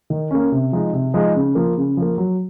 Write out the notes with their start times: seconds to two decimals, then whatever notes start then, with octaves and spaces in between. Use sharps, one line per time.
0.10 D#3
0.31 A#3 C#4
0.52 C3
0.72 F3 G#3 D#4
0.93 C3
1.14 F3 G#3 D#4
1.35 C#3
1.55 F3 A#3
1.77 C#3
1.97 F3 A#3
2.18 F#3